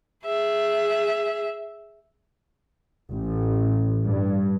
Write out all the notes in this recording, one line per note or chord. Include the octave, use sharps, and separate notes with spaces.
G#4 E5
A1
G2